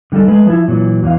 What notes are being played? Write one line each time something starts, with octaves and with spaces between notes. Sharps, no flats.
D3 G3 D#4 F4 A4
G#3 A3 B4
F3 E4
A#2 E3 F#3
E2 E3 F5